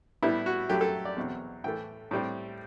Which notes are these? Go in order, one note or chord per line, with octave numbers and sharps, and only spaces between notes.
A2 G3 B3 E4
F#4
F#2 F#3 A3 G4
A4
D5
E2 B2 F#3 C4
A2 E3 A3 G5
A2 G3 C4